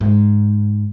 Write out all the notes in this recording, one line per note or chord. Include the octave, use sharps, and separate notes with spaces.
G#2